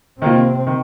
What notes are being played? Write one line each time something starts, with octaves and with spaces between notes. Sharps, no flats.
C3 D#3 A#3 C4 F4
D#3